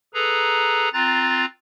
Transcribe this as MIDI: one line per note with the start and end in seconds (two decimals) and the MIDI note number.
0.14 0.89 68
0.14 0.89 69
0.14 0.89 71
0.14 0.89 82
0.93 1.45 60
0.93 1.45 65
0.93 1.45 82
0.93 1.45 90
0.93 1.45 93